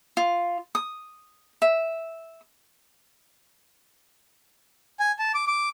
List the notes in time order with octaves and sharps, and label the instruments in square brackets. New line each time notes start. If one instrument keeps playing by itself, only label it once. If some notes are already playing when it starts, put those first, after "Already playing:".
[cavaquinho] F4
D#6
E5
[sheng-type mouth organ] G#5
A5
D6
D6